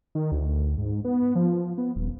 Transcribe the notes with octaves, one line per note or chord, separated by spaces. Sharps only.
D#3
D2
G#2
B3
F3
B3
D#1